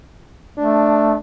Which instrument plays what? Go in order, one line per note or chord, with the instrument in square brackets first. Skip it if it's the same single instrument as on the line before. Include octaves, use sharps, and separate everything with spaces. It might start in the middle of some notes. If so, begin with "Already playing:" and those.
[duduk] A3 [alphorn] D4